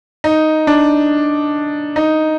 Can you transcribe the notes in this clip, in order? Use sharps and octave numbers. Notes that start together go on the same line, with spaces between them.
D#4
D4
D#4